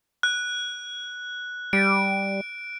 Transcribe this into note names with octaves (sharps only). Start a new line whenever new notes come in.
F#6
G3 D7